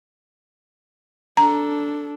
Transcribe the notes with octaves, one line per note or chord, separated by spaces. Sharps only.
D4 A4 A#5